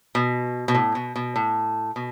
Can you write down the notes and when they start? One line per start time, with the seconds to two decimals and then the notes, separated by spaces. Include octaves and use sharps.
0.15 B2
0.68 B2
0.75 A2
0.95 B2
1.16 B2
1.36 A2
1.96 B2